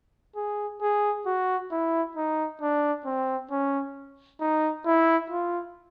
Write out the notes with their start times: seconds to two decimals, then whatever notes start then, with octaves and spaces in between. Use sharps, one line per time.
0.36 G#4
0.81 G#4
1.26 F#4
1.71 E4
2.17 D#4
2.61 D4
3.05 C4
3.51 C#4
4.40 D#4
4.86 E4
5.30 F4